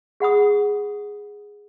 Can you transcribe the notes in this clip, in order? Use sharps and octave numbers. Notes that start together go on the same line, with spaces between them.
G#4 F#5 B5 D#6